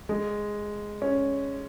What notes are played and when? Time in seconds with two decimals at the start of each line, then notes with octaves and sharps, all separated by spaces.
0.09 G#3
1.02 C#4